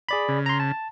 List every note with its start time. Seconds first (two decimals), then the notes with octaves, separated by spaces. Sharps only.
0.09 G#4 D5 B5
0.28 C#3
0.46 A#5 C6
0.60 A5